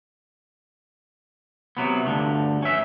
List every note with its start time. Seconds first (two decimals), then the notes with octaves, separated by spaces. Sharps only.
1.77 C3 F#3 B3
2.06 D2 G2 D3
2.62 C#4 E5